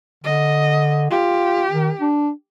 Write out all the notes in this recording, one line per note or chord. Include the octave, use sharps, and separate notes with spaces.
D3 D#5
F4 G4
D#3
D4